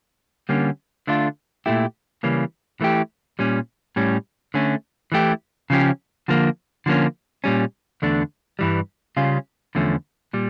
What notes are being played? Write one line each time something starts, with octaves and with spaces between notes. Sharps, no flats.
D3 G3 A#3 C#4
D3 A3 D4 F4
A#2 A3 E4 G4
C#3 E3 G3 A#3 C#4
E3 A3 E4 G4
A#2 G3 C#4
A2 G3 C#4
D3 A3 C#4
E3 A3 E4 G4
C#3 F3 C#4 G4
D3 F3 A#3
D3 F3 A#3 C#4
A#2 G3 C#4
E2 D3 A3 D4
G2 E3 G3
C#3 G3 C#4 F4
E2 D3 F3 A3 C#4
A#2 G3